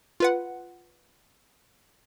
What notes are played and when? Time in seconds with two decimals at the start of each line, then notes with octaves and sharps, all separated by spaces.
0.20 F4 B4 F#5